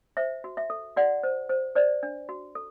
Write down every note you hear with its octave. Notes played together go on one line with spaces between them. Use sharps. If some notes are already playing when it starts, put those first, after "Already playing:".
C5 E5
F#4
E5
A4
F#4 D5 F#5
C5
C5
C5 D5
D4
F#4
A4